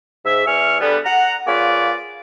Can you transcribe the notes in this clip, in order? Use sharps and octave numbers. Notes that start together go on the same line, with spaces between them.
G#2 E5
E2 G#4 E5 C#6 F6
D3 G3 B3
F#5 A#5
A#3 F4 G#4 B4 C#5 D5